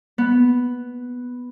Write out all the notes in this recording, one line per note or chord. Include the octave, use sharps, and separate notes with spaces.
B3